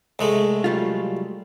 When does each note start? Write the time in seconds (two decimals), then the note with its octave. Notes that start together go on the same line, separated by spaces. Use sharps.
0.19 C2 G#3 A3
0.64 F#3 G3 F4